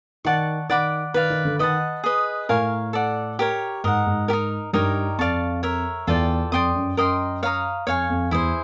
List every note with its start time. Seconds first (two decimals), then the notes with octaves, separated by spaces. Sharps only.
0.25 D#3 D5 F#5 A5 C#6
0.69 D#3 D5 F#5 B5 D6
1.14 D#3 B4 D5 F5
1.30 D#3
1.45 D3
1.59 D#3 B4 D#5 F#5 A5
2.04 G#4 B4 D#5
2.49 A2 A#4 C#5 F5 G#5
2.93 A4 D5 F#5
3.39 G4 A#4 C#5
3.84 G#2 A#4 D#5 F#5
4.06 G#2
4.28 G4 A#4
4.33 D#4
4.73 G2 D#4 G4 A#4 C#5
5.18 F2 D5 F5 A5 C#6
5.63 A#4 C#5 E5
6.07 E2 F4 A4 D5 G5
6.52 F2 D5 G5 C6 D#6
6.75 F#2
6.97 F#2 A#4 D#5 G5 C6
7.43 C#5 F5 A#5 D#6
7.87 F2 C#5 F5 G#5 C#6
8.10 F2
8.31 E2 E4 G#4 C5